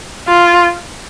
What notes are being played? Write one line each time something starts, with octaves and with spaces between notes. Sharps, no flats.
F4